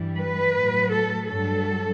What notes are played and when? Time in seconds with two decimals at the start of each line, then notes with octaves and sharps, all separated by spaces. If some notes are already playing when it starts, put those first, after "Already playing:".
Already playing: G2 E3 G3
0.17 B4
0.54 A2 F#3
0.92 A4
1.28 G2 F#3 A4